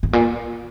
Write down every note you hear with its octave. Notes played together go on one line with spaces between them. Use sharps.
G#2
A#2